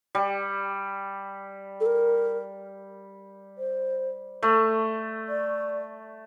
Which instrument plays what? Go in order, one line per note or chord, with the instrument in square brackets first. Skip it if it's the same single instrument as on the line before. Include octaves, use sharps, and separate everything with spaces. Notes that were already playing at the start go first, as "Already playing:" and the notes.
[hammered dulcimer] G3
[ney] A4
A#4
C5
[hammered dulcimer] A3
[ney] D5